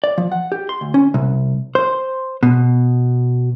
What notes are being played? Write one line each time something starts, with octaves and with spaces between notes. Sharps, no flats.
D5
F3
F#5
G4
C6
D2
C#4
C2
C5
B2